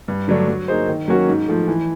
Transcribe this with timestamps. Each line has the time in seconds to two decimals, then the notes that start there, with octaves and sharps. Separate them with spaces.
0.08 G2
0.28 D3 F#3 A3 D4
0.48 F#3
0.68 A#3 D#4 G#4 C5
0.88 D#3
1.08 F#3 A#3 C#4 F#4
1.28 G#2
1.48 F3 A3
1.68 E3